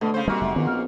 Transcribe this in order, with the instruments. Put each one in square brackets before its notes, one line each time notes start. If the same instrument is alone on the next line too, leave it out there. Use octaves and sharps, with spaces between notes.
[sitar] B2 [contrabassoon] D3 [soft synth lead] A3
[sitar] C#3 C5
[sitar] G#2 F#4 [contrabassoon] C3 [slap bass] G3 A#3 [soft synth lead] F6
[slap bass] F#1 G3 A3 [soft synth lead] E5
[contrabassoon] A#1 [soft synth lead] D#3 [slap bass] B3 C4
[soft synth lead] F6